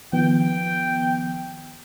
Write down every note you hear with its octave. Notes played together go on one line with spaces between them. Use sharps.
D#3 F3 B3 G5